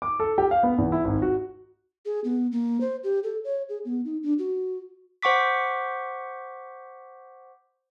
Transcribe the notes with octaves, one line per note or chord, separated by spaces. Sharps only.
D6
A4
G4
F5
B3
E2
E4
G#1
F#4
G#4
B3
A#3
C5
G4
A4
C#5
G#4
B3
D#4
D4
F#4
C5 F#5 C#6 D6 B6